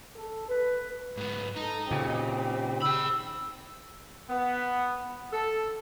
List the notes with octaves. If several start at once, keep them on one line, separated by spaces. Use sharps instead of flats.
A4
B4
G#2 B3 B4
D#4 A4 A#5
A#2 C#3 C4 G4
G#4 B5 E6
B3
A4